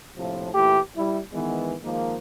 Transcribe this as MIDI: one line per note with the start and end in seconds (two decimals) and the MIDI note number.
0.17 0.50 34
0.17 0.50 45
0.17 0.50 48
0.17 0.50 53
0.54 0.79 46
0.54 0.79 52
0.54 0.79 57
0.54 0.79 64
0.54 0.79 67
0.95 1.20 55
0.95 1.20 64
1.33 1.75 51
1.33 1.75 52
1.33 1.75 56
1.33 1.75 59
1.82 2.16 51
1.82 2.16 53
1.82 2.16 56
1.82 2.16 58